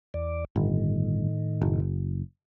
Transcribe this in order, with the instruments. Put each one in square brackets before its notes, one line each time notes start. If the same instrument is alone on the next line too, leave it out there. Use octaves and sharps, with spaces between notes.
[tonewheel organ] E2 D5
[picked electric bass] G1 [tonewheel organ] A2 D#3
[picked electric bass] F#1